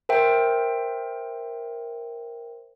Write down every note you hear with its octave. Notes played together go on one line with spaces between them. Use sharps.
A#4 C5 E5 G5